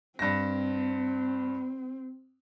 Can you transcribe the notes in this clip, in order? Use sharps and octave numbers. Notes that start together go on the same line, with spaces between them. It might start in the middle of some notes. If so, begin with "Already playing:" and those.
G2 C4 A#6